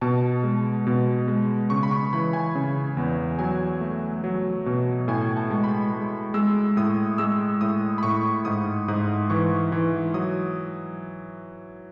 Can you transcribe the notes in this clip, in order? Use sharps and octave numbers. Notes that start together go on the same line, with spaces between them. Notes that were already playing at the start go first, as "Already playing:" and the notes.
B2 A5
G#3
B2
G#3
C#3 C#6
B5
C#6
E3 B5
G#5
C#3
E2
F#3 G#5
A3
F#3
B2
A2 G#5
A5
G#3
B5
G#3
G#3 E6
A2 D#6
G#3 E6
A2 D#6
B5
A2 C#6
G#2 D#6
G#2 D#6
E3 C#6
E3
F#3 D#6